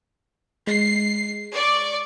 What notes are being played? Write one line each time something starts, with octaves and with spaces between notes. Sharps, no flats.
G#3 C7
D5 C#6